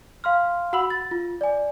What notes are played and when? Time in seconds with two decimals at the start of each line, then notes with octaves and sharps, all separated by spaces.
0.24 F5 C6 F6
0.73 F#4 F#5 B5 E6 F#7
0.90 A6
1.11 F4
1.41 D5 G#5